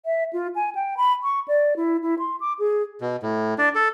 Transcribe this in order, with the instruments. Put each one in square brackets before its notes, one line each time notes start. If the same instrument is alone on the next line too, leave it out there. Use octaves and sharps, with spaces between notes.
[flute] E5
F4
G#5
G5
B5
C#6
D5
E4
E4
C6
D6
G#4
[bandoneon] B2
A2
D4
A4